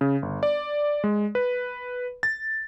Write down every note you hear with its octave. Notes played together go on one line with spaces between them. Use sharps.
C#3
G1
D5
G#3
B4
A6